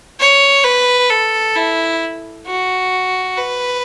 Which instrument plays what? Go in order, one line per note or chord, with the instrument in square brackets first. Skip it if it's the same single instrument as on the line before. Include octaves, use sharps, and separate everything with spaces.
[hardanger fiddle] C#5
B4
A4
E4
F#4
B4